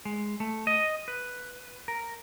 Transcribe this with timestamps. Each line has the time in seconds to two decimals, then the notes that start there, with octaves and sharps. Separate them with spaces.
0.05 G#3
0.40 A3
0.67 D#5
1.08 B4
1.88 A#4